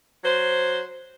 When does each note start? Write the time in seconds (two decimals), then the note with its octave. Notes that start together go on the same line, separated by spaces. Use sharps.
0.24 F#3 C5